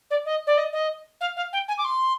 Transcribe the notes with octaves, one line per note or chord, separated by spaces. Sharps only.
D5
D#5
D5
D#5
D#5
F5
F5
G5
G#5
D6
C6